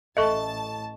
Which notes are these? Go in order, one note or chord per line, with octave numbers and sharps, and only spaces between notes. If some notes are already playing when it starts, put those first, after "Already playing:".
A1 A4 D#5 E5 A5 C#6